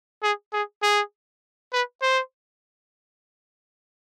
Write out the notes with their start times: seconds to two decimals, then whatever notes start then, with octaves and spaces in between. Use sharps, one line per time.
0.23 G#4
0.53 G#4
0.82 G#4
1.73 B4
2.02 C5